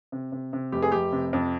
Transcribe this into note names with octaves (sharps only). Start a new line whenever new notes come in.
C3
C3
C3
F1 G4
G#4
F1 G4
C3
F2